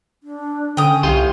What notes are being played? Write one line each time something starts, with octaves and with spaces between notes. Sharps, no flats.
D4
D3 C#4 G5 D#6
C2 G4 F5 C6